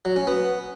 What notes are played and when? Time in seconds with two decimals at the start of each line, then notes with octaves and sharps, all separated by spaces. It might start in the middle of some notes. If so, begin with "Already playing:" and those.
0.05 F#3
0.16 C#4
0.27 B3